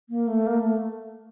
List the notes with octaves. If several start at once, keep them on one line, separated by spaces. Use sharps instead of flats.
A#3
A3
A#3
A3